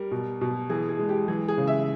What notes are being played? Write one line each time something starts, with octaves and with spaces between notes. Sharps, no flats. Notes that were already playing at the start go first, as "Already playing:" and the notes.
Already playing: G3 A#4
B2
B2
E3 G#4
G#4
G#3
G4
E3 G#4
G#4
C#3
E5